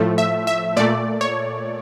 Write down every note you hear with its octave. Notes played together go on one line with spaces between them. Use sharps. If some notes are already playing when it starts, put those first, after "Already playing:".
Already playing: A2 F3 A3
E5
E5
A#2 A3 D5
C#5